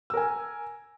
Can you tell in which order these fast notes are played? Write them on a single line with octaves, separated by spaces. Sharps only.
E6 A#4 G#5